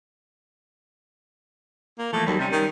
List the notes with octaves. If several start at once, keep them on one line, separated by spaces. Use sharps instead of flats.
A#3
E3 F3 A3 A#3
D#2 F#3 G3
C3 G3 C#4
D#3